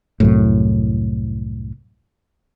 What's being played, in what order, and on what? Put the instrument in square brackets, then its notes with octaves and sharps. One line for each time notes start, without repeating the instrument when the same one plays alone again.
[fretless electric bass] C2 F#2 A2